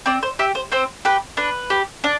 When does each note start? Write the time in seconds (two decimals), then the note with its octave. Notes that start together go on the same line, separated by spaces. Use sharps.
0.06 C4 D5
0.23 C5
0.39 G4 E5
0.55 C5
0.72 C4 C5
1.05 G4 B4
1.37 D4 B4
1.70 G4
2.04 D4